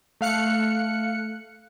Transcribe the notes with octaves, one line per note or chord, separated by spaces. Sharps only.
A3 F5 F#6 C#7